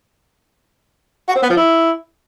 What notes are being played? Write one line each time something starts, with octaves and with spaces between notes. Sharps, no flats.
F#4
C4
B3
F3
E4